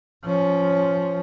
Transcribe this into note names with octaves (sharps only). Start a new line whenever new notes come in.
F3 C#4